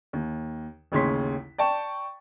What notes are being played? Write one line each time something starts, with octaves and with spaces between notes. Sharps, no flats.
D#2
A1 D#2 C#3 C#5 C6 B6
D5 G5 A5 C#6